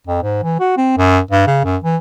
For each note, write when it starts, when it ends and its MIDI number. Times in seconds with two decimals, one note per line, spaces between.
0.07 0.20 41
0.23 0.42 44
0.43 0.58 52
0.60 0.76 66
0.77 0.97 60
0.98 1.19 42
1.31 1.45 43
1.47 1.61 49
1.64 1.77 42
1.84 1.97 52